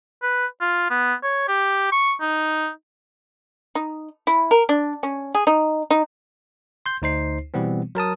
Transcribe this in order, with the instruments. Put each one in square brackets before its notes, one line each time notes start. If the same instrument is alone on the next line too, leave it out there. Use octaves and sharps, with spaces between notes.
[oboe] B4
F4
B3
C#5
G4
C#6
D#4
[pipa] D#4
E4
A#4
D4
C#4
G#4
D#4
D#4
[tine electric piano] C6 G6
D2 D#4 C5 C7
B2 E3 G3 B3 C4
F#3 A#4 A5 D#6